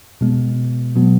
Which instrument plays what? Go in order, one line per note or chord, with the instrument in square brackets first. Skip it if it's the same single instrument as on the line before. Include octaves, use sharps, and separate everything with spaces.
[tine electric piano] B2 G#3 B3
B2 F#3 B3